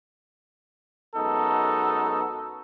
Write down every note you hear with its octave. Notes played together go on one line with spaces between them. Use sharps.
F#2 G#3 B3 D#4 F#4 A4